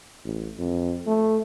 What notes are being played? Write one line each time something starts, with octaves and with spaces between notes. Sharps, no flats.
A1
F2
A3